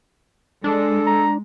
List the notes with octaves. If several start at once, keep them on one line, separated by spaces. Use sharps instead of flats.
G#3 D4 A4
A#5